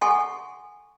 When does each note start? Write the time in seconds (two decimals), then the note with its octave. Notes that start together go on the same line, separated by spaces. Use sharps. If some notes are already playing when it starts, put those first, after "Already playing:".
0.01 A4 F#5 G#5 C6 C#6